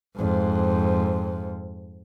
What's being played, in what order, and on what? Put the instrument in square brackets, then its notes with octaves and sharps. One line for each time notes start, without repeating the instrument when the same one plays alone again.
[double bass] F2 G#2